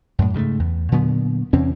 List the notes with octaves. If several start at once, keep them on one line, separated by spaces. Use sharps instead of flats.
F#2 A2
G#2 C#3 G#3 A3
E2
A#2 D3 F#3 B3
E2 C3 C4 C#4